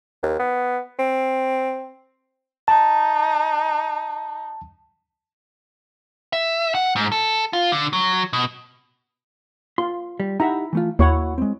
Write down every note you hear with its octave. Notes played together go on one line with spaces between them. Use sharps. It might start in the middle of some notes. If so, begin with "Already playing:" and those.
D#2
B3
C4
D#4 A5
E5
F#5
G#2
A4
F4
D3
F#3
B2
F4 C6
G3
D#4 E4 G4 E5 F#5 A#5
E3 A3 F4
D#2 A#3 E4 F#4 C#5 F#5 C#6
G#3 C4